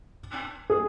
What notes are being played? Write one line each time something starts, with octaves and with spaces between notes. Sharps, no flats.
G#4